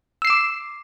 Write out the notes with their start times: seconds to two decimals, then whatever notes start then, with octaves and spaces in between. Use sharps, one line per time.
0.22 E6
0.25 C7
0.27 E7
0.30 D6